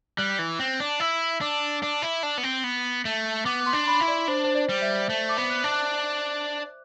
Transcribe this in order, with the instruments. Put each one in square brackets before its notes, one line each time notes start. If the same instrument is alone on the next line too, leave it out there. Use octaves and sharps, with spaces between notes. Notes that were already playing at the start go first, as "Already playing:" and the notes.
[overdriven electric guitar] G3 [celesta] F#6
[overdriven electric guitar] E3
C4
D4
[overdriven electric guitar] E4 [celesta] E6
[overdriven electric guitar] D4 [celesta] D6
[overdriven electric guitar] D4
E4
D4
B3
C4
B3
A3
[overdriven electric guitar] B3 [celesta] D6
[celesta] D6
C6
[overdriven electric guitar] D4
[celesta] B5
[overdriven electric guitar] E4
[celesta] D5
[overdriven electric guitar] D4 [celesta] C5
[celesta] C5
D5
[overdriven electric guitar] G3
[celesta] E5
[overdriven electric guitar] A3
[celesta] D6
[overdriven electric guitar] B3
[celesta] F#6
[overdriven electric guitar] D4
[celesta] F#6